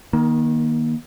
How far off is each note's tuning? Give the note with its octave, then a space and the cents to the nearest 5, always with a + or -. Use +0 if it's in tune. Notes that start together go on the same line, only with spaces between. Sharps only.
D#3 +0 A#3 +30